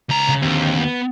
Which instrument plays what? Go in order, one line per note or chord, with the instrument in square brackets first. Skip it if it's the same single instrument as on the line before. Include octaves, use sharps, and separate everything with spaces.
[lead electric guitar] C#2 A#5
[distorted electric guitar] C#3
[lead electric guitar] D#2 [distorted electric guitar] D3 C4
[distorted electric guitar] B3